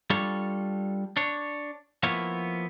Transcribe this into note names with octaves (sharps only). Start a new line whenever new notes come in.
G3 D4 F4 A4 C#5
D4 C#5
F3 A#3 B3 E4 C#5